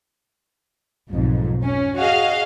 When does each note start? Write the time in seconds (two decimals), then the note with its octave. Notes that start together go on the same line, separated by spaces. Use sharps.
1.10 B1 F2 G#2
1.62 C#4
1.96 F#4 G#4 D#5 F5